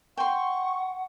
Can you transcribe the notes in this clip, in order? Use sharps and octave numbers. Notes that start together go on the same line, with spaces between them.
F#5 G5 C6 C#6